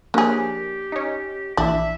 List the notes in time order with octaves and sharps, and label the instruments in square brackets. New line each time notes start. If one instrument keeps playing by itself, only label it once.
[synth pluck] F3 A#3 C#4 [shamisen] D4 G#4 [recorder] G4
[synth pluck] C#4 D#4
[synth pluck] A#1 E3 [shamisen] D4 [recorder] E5